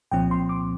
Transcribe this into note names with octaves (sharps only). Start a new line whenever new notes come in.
C2 A#2 F3 C4 G5
C6
D6